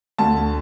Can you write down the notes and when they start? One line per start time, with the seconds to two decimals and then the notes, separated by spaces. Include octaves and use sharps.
0.18 D2 A5